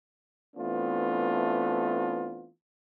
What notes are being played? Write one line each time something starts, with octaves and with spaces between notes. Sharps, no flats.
E3 A3 B3 C4 D4 F4